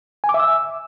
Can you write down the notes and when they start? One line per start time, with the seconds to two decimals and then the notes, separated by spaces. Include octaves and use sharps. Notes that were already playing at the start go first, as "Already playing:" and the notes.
0.24 G#5
0.29 D6
0.34 E5
0.40 E6